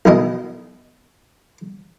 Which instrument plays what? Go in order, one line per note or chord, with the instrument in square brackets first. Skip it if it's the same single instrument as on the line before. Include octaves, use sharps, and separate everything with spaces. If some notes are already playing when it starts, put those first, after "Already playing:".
[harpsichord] B1 D#3 E4 D#5